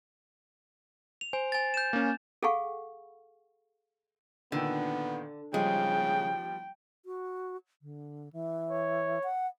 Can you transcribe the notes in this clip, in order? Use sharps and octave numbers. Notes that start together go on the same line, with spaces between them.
F7
C5 G#5
G#5 A6
G6 E7
A#3 C#4
G#4 A4 F5 F#5 G#5 C#6
A#2 D3 D#3 B3 G5
C#3 F3 G3 G#3 G5
F#4
D3
E3
C#5
F#5